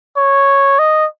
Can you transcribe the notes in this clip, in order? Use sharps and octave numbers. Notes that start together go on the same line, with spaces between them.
C#5
D#5